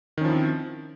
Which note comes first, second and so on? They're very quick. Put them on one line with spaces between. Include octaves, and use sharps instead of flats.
D#3 C#4 F3 E4 C4